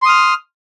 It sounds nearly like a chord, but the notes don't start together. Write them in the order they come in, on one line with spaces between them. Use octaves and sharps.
C6 D#6 F6